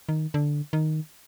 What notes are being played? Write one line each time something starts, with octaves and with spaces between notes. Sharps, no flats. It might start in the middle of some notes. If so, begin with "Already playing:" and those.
D#3
D3
D#3